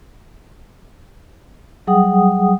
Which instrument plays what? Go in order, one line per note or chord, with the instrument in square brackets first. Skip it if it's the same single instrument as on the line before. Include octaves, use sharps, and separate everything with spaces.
[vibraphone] F#3 G3 G#4 F#5 G5 D#6